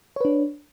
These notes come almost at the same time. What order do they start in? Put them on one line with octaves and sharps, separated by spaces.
C#5 B4 D4